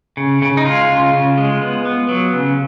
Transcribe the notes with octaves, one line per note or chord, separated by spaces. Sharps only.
C#3
C#3
D#4
G#3 F4
C#3
C#3
G#3
B3
B3
F#3
C#3